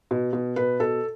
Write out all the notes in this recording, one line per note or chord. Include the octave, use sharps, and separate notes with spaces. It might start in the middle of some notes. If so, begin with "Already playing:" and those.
B2
B2
B2 B4
B2 A4